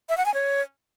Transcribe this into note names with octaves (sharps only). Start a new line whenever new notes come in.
E5
F#5
G#5
C#5